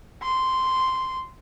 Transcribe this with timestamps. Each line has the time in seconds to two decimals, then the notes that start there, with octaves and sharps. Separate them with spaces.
0.23 C6